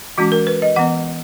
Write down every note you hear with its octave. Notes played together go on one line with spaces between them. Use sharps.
E3 G#3 C#4 F#4
A#4
B4
D#5
E3 B3 F#5